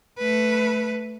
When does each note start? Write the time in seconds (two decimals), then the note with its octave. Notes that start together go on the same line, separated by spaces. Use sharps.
0.19 A3 B4